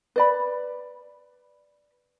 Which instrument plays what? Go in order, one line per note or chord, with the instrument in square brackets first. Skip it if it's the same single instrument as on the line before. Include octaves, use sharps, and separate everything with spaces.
[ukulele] B4 D5 B5